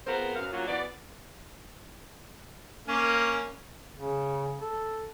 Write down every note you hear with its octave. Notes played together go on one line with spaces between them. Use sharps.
B3 C4 F4 G#4 A#4 C5
F#2 F5
F#3 A#3 C#4 F4
E3 B3 F#4 D5
A#3 C#4
C#3
A4